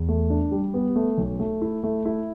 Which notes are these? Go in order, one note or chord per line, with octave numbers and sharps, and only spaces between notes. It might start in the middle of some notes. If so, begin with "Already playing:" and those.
Already playing: E2
A3
D4
G3
B3
A3
B1
A3
E4
A3
E4